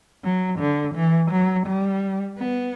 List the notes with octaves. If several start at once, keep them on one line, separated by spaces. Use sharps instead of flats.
F#3
D3
E3
F#3
G3
B3